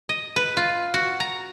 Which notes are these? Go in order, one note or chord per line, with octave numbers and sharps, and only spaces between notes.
D#5
B4
F4
F#4
A#5